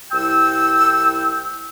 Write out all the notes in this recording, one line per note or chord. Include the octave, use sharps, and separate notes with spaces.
C2 E4 G5 E6